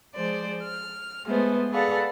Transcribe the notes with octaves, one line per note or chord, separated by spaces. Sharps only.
F3 G#3 C5 D5
F6
G#3 A3 B3 G#4 C5
G#4 A4 B4 D5 F5 F#5